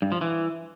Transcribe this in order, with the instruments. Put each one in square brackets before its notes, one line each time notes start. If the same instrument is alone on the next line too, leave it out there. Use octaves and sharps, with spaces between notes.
[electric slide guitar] G2
F3
E3